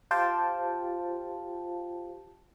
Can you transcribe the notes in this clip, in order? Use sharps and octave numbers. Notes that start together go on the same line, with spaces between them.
F4 G4 C5 F5 G5 A5